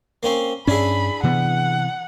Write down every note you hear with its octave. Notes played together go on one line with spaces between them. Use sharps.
A#3 C4 C#4
G2 C#4 D4 E4 G#4 B5
C3 E3 B3 F#5